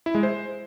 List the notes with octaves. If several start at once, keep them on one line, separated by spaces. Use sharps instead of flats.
E4
G#3
C5